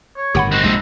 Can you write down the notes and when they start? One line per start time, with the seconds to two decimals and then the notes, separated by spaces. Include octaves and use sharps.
0.16 C#5
0.35 G1 A2 D#3 G4 F#5 B5
0.52 C4 D#4 F#4
0.64 A#1 F#2 C3 G#3 A4